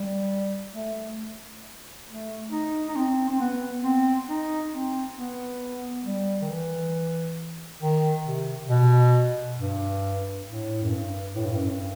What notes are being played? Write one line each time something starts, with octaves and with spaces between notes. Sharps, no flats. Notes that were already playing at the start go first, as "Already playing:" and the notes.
Already playing: G3
A3
A3
D#4
D#4
C4
C4
B3
C4
D#4
C4
B3
G3
D#3
E3
D#3
C3
B2
G2
A2
F#2
G2
A2
G2
F#2
G2